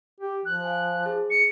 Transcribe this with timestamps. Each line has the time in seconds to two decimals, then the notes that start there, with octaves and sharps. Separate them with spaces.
0.20 G4
0.45 F3 F#6
0.64 F5 G#5
1.06 G#4
1.30 C#7